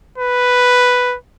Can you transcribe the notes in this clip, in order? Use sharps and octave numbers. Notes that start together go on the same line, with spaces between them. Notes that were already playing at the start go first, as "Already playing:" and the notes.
B4